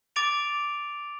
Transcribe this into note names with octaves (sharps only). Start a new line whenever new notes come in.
D6 A6 D7 F7